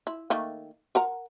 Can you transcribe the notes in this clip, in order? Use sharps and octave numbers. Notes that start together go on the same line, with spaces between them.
E4
D#3 A3 A#3
A#4 F#5 A#5